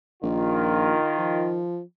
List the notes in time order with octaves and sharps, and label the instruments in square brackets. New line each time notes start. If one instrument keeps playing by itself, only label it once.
[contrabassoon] A#1 [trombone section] D#3 F4
[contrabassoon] F3